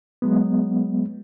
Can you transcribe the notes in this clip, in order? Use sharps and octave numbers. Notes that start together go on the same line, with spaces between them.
F#3 G#3 B3